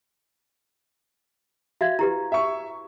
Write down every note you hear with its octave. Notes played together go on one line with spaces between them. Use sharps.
F#4 E5 F5 G#6
E4 G4 B4 A#5
E5 C#6